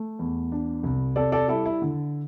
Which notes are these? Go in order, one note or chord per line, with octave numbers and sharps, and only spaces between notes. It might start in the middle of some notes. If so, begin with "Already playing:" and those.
Already playing: A3
E2
D4
C2
C3 A4 D5
A4 D5
G3 E4 A4
E4
D3